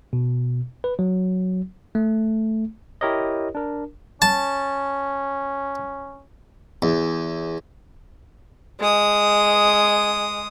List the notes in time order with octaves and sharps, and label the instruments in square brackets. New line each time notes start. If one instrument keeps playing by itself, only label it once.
[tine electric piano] B2
B4
F#3
A3
E4 G4 A#4 C#5 D#5
D4 A#4
[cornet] C#4 [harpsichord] A5
[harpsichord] E2
[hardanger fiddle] G#3 D#6